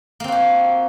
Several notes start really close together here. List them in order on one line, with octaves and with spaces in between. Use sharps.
A#3 C4 F#4 G4